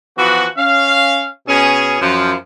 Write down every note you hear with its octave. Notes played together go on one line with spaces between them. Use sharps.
E3 F3 B3 F#4
C#4 F5
B2 C#4 G#4
F#2 F3